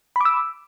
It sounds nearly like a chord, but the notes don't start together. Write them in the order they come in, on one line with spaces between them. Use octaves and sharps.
B5 D6 E6